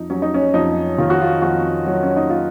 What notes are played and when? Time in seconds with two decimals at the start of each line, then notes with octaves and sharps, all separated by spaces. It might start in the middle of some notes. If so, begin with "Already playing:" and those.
Already playing: F2 D#4
0.10 F#3 C#4
0.22 D#4
0.34 C#4
0.54 F2 D#4
0.98 D#3 F4
1.10 F#4
1.22 F4
1.42 F2 F#4
1.87 F#3
2.03 C#4
2.17 D#4
2.30 F4